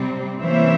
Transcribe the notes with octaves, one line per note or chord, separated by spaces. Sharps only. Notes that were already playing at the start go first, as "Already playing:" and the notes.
Already playing: C3 G3 C4
C3 E3 A#3 C#4 C5 E5